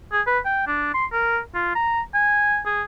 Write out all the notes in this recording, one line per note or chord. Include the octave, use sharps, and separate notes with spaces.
G#4
B4
G5
D4
C6
A#4
F4
A#5
G#5
G#4